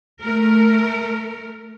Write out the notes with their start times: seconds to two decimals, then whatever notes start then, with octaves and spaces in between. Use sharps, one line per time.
0.21 A3 A#4